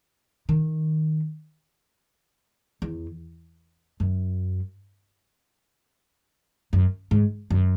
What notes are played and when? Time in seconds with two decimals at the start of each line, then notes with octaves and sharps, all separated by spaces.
0.49 D#3
2.82 E2
4.00 F#2
6.73 F#2
7.11 G#2
7.50 F#2